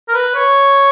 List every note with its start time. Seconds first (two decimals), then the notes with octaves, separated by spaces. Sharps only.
0.08 A#4
0.14 B4
0.35 C#5